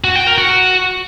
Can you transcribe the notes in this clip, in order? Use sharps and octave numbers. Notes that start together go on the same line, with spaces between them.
F#4
G5
A#4
F#4